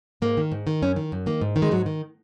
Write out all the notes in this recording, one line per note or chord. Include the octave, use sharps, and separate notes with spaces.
G#2 A#3
D#3
G#2
D#3
F#2 C#4
D#3
F#2
D#3 A#3
G#2
D#3
G#3
G#2 F#3
D#3